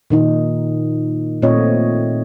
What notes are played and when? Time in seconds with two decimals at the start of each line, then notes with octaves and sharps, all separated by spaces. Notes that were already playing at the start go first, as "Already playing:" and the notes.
0.10 A#2 D#3 D#4
1.42 A#2 A3 C4 F4 C#5 D#5